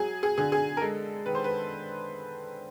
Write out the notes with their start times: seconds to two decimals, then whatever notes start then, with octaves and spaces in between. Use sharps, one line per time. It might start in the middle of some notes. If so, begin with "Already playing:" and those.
Already playing: F#3 G#4
0.23 G#4
0.38 D3 G#4
0.52 G#4
0.77 A#4
0.81 G#3 A4
1.26 D#3 B4
1.35 C5
1.44 B4